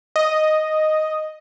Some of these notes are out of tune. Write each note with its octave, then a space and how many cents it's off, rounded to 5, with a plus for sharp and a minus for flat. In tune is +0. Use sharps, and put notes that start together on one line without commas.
D#5 +0